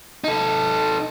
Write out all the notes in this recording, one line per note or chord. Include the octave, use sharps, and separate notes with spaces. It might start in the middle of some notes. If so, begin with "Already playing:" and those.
D#4 A4